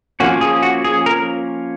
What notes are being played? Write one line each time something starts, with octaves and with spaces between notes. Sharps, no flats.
F3 A#3 C#4 F#4
G#4
F#4
G#4
A#4